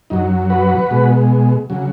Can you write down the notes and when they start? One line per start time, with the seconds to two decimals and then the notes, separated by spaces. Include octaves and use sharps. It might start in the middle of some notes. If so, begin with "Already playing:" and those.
0.10 F#2 F#3 D#4
0.50 F#4 B4
0.91 B2 G#3
1.70 C#3 F#3